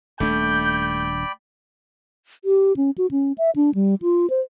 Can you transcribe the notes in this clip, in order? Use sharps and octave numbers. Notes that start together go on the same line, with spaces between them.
D#1 A3 D4 D5 G5 B5 G6
G4
C#4
F#4
C#4
E5
D4
G3
F4
C5